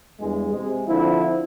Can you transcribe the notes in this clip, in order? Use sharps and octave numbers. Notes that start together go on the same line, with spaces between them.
E2 G2 G#3
C3 G#3
D3 F3 C4 E4 F4